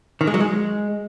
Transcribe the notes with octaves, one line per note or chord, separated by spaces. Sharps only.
D#3
G#3
F#3
G#3